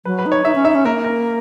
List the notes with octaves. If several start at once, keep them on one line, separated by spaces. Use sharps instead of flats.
F#3 B4
B4
D#4
C#5
D#4 E5
C#4
D#4 E5
C#4
A#3 A#4
A#4